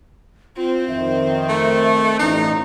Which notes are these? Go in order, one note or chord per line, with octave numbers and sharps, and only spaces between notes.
C4 F4 C5
F2 D#3 E5
A3
A1 G2 D#4